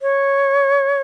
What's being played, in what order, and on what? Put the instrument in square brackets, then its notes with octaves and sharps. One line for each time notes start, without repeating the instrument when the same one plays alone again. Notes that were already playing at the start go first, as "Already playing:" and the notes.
[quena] C#5